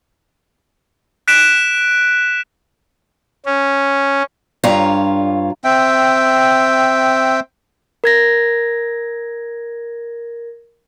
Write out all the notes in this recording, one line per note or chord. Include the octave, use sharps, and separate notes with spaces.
F#6 B6 D7 E7
C#4
G2 F4 C#5 A#5
C4 E5 G5
A#4 G#6 A#6